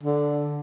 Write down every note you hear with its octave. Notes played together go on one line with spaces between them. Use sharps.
D3